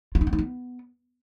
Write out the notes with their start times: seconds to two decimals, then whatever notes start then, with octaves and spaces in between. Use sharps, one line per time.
0.15 F4
0.21 D#4
0.27 C4
0.33 D#4
0.39 B3